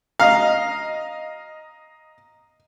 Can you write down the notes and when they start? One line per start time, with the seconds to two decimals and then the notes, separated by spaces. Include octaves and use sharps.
0.20 D#5 F5 A#5